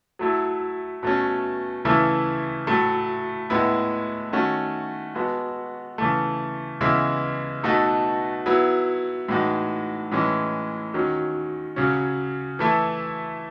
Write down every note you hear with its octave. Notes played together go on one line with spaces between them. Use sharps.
F#3 A3 E4
B2 A3 C#4
C#3 E3 A3 E4
A2 F#3 A3
A2 G#3 B3 E4
D#3 A3 C#4 F#4
G#3 B3 F#4 A4
C#3 E3 A3
C#3 E3 G#3 B3 E4
B2 A3 D#4 F#4 A4
F#3 B3 E4
A2 E3 G#3 D#4 F#4
A2 E3 G#3 C#4
D#3 F#3 C#4
C#3 F#3 C#4
E3 A3 E4 A4